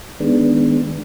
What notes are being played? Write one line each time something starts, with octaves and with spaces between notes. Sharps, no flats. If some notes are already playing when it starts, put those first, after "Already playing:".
D#3 G#3 B3 D4